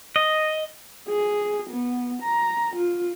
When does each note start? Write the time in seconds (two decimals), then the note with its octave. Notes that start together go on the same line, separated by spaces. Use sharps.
0.16 D#5
1.08 G#4
1.70 B3
2.22 A#5
2.76 F4